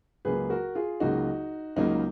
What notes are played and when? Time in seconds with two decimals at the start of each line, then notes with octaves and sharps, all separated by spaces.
0.25 C#2 C#3 F#3 A#3 G#4 B4
0.50 F#4 A#4
0.75 F4 G#4
1.00 C#2 C#3 F#3 A#3 D#4 F#4
1.76 C#2 C#3 F#3 A#3 D#4